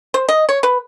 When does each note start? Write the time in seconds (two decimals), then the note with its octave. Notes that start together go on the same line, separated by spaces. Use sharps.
0.14 C5
0.29 D#5
0.49 C#5
0.63 B4